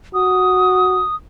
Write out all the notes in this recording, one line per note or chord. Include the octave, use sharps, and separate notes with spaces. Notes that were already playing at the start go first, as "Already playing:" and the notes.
F#4 D#6